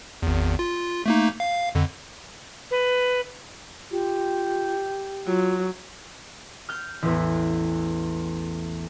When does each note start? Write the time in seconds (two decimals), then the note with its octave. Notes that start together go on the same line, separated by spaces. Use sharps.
0.22 G#1 E2
0.59 F4
1.06 A3 A#3 D#4
1.40 F5
1.75 F2 D3
2.71 B4
3.91 F4 G4
5.27 F#3 F4
6.69 F6 G6
7.02 A1 E2